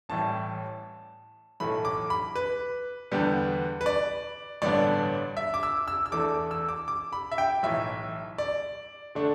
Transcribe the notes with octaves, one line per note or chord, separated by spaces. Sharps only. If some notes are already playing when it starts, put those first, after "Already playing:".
A1 A2 E3 G3 A5
B1 A2 E3 A3 B5
D6
B5
B4
E2 D3 G3 B3
B4
D5
A1 G2 D3 B3 D4 D5
E5
D6
E6
E6
E6
E2 E3 A3 D4 D6
E6
D6
D6
B5
E5
G5
B1 A2 E3 E5
D5
D3 A3 D4